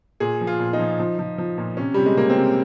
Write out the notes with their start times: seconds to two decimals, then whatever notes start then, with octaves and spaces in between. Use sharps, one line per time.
0.20 A#2 G#4
0.41 F3
0.47 F4
0.60 A#2
0.73 D#4
0.80 F3
1.00 F3
1.19 F3
1.38 F3
1.58 A#2
1.77 C3 C#4
1.94 C3 G3
2.06 G#3
2.16 C3 A#3
2.30 C4
2.37 C3